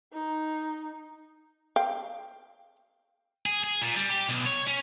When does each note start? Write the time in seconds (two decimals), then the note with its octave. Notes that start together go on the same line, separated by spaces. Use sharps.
0.12 D#4
1.76 F5 G5
3.46 G#4
3.64 G#4
3.81 A#2
3.96 G3
4.10 G4
4.29 B1
4.46 C#5
4.68 C#4